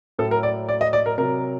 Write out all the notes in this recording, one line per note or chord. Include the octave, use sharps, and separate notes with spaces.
A2 F#3 A4
A#4
D5
D5
D#5
D5
A#4
C3 F#3 A#4